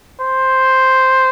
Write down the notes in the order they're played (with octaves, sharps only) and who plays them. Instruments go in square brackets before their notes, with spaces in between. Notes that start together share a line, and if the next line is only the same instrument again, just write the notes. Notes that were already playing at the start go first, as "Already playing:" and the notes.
[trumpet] C5